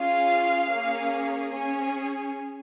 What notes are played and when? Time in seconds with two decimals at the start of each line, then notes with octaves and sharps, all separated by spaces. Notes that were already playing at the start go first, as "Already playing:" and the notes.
Already playing: C#4 F4 G#4 F5
0.70 A#3 C#4 G#4
1.53 C#4 G#4 G#5